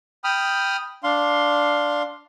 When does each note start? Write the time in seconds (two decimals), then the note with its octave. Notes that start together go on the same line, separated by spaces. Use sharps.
0.24 G5 B5 D#6 F6
1.04 D4 F5 C6